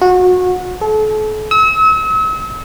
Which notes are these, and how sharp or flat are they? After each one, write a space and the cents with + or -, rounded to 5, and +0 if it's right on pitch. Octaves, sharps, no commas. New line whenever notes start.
F#4 -25
A4 -35
E6 -40